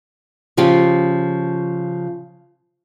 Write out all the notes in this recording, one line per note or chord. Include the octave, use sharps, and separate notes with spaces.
C#3 F3 F4 G4